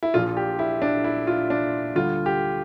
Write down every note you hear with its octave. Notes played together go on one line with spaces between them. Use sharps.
E4
A#1 A#2 F3 F4
G4
E4
D4
E4
F4
D4
D2 D3 G3 F4
G4